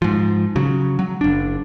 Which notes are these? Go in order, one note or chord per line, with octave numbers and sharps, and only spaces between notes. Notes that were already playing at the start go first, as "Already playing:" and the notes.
G#2 F3
C#3 F#3
F#3
F#1 D4